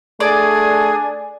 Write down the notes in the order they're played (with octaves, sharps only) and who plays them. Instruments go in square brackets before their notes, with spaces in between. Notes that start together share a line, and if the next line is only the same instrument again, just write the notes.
[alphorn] A3 [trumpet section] D4 G#5 [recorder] G#4 [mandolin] D5